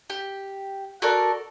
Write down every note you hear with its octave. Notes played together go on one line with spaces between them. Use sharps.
G4
F#4 A4 A#4 D5